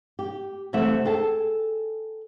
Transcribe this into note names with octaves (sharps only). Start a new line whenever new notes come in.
G4
C3 E3 G3 A3 E5 F#5
G#4 A4 G5 A5